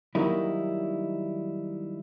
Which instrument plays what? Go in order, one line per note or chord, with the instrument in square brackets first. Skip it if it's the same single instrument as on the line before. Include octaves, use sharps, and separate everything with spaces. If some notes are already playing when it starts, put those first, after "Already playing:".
[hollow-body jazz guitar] D#3 F#3 G3 A#3 D#4 E4